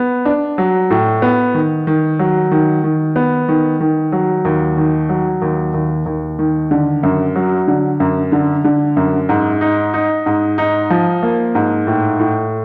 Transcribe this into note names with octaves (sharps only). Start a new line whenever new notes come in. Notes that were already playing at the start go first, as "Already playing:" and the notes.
Already playing: B3
D4
F#3
A2
B3
D#3
D#3
F#3
D#3
D#3
B3
D#3
D#3
F#3
D#2
D#3
F#3
D#2
D#2
D#2
D#3
D3
F#2
F#3
D3
F#2
D3
D3
F#2
G#2
D#4
D#4
G#2
D#4
F3
A#3
G#2
A2
A2